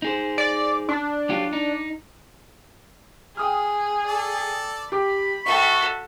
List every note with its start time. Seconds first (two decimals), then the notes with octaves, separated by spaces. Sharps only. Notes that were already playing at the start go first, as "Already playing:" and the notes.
0.02 D#4 G#4 C5
0.38 D5
0.89 D4
1.30 F#3 F4 G4
1.53 D#4
3.37 G#4 G5 D#6 F6
4.07 A4 D5
4.92 G4 B5 D6
5.46 F#4 A4 D#5 E5 G5 C#6